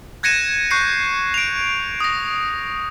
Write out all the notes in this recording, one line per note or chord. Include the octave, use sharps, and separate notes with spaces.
F#6 G#6 A#6 C#7 D#7 E7
C#6 F#6 G6 C7 C#7 D#7
D7 F7
D#6 A#6